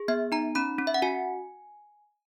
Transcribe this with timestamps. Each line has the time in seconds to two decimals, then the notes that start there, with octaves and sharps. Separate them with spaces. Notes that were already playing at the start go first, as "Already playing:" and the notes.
Already playing: G#4
0.08 B3 E5
0.32 D#4 A#5
0.55 C#4 B5
0.79 C#4
0.87 E5
0.94 F#5
1.02 F#4 G#5